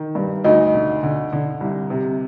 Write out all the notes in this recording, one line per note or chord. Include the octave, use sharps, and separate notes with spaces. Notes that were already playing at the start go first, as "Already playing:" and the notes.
Already playing: D#3
G2
D2 D#4
D3
D3
D3
C2
C3